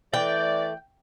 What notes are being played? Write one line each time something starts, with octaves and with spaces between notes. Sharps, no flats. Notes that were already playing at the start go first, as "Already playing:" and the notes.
E3 A3 D5 G5